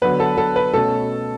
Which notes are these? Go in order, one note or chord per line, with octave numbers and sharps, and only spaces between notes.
D3 F#3 B3 B4
A4
A4
B4
B2 A3 C#4 A4